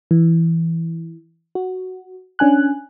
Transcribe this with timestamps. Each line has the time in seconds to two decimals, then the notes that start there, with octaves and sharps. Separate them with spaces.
0.11 E3
1.55 F#4
2.39 C#4 D4 G#5 F#6